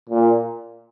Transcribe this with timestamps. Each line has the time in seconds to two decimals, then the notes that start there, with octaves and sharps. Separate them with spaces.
0.09 A#2